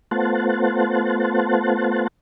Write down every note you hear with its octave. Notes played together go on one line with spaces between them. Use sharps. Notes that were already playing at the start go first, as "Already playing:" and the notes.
A3 B3 F4 C5 F#5 A5